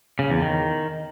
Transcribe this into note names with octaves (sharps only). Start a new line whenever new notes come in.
C#3
E2
D#3